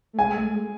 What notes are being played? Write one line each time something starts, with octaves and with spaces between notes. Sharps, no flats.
A3
G#3 G#5
A3
G#3